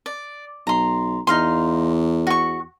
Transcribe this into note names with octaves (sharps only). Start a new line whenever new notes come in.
D5
B1 A#5 C6
E2 D#4 F5 C6
F#4 C#6